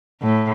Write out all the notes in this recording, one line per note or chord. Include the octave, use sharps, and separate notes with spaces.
A2